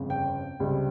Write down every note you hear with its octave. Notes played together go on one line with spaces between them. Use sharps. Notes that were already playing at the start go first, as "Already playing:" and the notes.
Already playing: G1 F2 C#3
G5
C#2 C3 G3